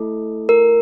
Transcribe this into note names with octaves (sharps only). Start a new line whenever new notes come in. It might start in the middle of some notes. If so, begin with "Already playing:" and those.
Already playing: A3 E4 A4
A#4